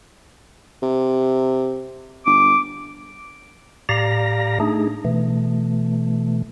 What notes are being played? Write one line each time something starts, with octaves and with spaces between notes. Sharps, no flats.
C3
G1 D6
A2 G4 D5 F5 A#5 A#6
A3 D4 D#4 G#4
B2 E3 A3